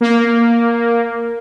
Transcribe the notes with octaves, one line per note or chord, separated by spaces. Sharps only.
A#3